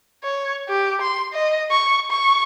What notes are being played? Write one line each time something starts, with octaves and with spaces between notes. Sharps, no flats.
C#5
G4
C6
D#5
C#6
C#6